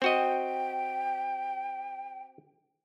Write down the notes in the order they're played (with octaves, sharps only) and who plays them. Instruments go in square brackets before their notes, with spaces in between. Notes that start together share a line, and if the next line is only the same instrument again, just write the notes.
[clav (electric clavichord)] C4 F#4 D#5 [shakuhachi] G5